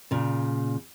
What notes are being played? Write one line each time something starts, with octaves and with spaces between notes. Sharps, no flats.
A#2 C#3